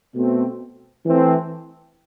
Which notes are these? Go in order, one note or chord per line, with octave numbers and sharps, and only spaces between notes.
B2 A3 C4
E3 A3 C4